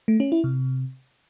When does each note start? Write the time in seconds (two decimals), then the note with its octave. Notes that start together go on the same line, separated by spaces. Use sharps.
0.08 A3
0.20 C#4
0.32 E4
0.44 C3